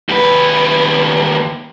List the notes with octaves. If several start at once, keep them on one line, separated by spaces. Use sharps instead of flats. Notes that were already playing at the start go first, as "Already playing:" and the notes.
D#2 B4